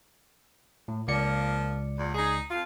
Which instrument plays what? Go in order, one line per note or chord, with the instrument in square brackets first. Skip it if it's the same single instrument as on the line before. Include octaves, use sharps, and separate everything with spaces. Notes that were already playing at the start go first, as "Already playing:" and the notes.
[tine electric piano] A2
[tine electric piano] C#2 D5 C#7 [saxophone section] F3 A#3
[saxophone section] E2 A#2
D#4 G#4
F2 F4